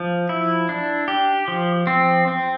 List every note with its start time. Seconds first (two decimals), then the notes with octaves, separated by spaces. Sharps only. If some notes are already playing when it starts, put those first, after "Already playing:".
Already playing: F3
0.29 E4
0.69 D4
1.08 G4
1.48 F3
1.87 C4
2.28 C4